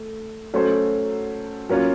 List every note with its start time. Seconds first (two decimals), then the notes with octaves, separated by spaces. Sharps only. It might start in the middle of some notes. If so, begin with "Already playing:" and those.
Already playing: A3
0.53 F#3 A3 C#4 A4 C5
1.69 F#3 A#3 C#4 F4